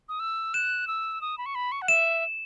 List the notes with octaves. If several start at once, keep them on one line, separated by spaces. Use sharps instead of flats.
D#6
E6
F#6 E7
E6
D#6
B5
C#6
B5
C#6
F#5
E5 E7